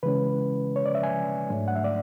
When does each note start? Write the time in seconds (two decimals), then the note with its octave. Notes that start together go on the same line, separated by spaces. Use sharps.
0.03 C#3 E3 G#3 C#4 B4
0.76 C#5
0.86 D5
0.95 E5
1.03 G#5
1.49 G#2 F#3 A3 D4
1.68 F#5
1.75 E5
1.84 D5